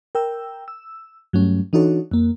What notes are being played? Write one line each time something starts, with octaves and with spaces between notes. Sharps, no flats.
A#4 G5 E6
E6
G2 F#3 A3 C#4
E3 D4 D#4 F#4 A4 C#5
F2 A#3